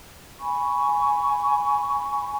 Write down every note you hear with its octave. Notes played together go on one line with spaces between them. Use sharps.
G#5 B5 C#6